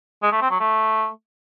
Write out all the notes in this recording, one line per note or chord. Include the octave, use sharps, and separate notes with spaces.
G#3
A3
C4
F#3
A3